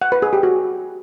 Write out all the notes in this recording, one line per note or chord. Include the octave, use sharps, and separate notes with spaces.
F#5
B4
G#4
G4
F#4